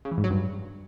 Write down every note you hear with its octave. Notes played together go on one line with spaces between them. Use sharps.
C#3
E3
G#2
F#3
G2